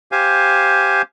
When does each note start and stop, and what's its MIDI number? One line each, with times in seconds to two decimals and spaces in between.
0.12 1.02 67
0.12 1.02 72
0.12 1.02 77
0.12 1.02 80